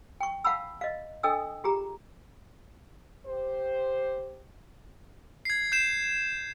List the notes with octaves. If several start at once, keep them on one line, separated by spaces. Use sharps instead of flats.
G5 C#6
F5 F#5 A5 B5 E6
D#5 F5
D4 A4 D#5 G5 D#6 E6
F4 G4 G#4 A#5
G4 C5
G#6 C7
G6 C7 E7